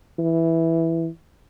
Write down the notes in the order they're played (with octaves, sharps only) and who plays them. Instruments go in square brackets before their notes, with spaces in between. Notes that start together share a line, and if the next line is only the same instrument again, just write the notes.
[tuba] E3